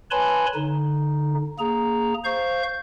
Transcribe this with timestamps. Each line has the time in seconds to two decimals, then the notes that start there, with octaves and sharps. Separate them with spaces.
0.11 B4 C#5 G#5 A5 B5 C6
0.55 D3 D#4
1.59 A#3 G#4 A#5
2.25 C5 F5 C#6 G6